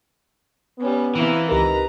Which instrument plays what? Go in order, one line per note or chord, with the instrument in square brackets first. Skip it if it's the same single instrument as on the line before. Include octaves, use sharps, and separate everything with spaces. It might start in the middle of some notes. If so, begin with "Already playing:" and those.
[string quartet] G3 C#4 [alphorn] B3
[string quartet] C3 A#3 E4 [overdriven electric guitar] E3
[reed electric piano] C#2 G4 A#4 [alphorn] D#4 [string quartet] B4 A#5